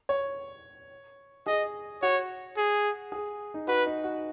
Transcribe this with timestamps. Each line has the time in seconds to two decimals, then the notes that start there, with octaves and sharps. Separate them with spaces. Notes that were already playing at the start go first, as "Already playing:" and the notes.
0.09 C#5
1.46 G#4 D#5
2.02 F#4 C#5
2.57 G#4
3.12 G#4
3.54 D#4
3.68 F#4 B4
3.86 D#4
4.04 F#4